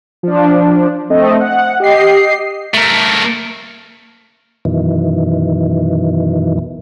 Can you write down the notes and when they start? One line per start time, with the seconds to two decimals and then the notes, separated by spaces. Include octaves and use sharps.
0.23 F3 D4
1.10 A3 C4 D#5
1.40 F#5
1.80 G4 D#5 C7
2.74 A3 A#4
4.65 F#2 B2 D#3 E3